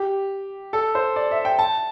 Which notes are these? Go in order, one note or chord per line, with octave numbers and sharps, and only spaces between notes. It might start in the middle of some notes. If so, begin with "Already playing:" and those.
Already playing: G4
A4
C5
D5
E5
G5
A5